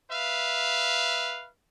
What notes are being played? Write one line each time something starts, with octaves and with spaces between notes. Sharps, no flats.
B4 E5 F5